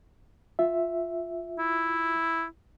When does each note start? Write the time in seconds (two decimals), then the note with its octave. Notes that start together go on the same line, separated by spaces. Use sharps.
0.59 F4 E5
1.59 E4